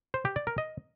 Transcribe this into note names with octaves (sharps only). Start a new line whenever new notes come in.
C5
G4
D5
A#4
D#5